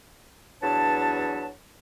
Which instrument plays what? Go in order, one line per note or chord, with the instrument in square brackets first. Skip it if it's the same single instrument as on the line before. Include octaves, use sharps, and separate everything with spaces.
[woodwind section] E2 F#3 D4 B4 C#5 A5